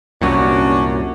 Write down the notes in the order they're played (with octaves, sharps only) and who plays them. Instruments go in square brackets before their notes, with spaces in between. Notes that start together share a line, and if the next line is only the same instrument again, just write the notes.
[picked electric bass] C2 F#2 A#2 [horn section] C#4 D4 F#4